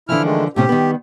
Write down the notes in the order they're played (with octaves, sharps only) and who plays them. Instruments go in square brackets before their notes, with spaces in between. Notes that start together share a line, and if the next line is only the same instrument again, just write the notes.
[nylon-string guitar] D3 E3 F3 [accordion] E4 F6
[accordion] D#3 G#3 A3
[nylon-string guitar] A2 C3 C#4 [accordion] G4
[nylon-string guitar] D#3 G3 B3